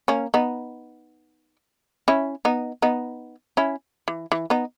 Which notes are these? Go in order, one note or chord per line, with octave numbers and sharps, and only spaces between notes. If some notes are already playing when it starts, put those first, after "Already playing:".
A#3 C#4
B3 D#4
C#4 E4
B3 D#4
B3 D#4
C#4 E4
E3
E3
B3 D#4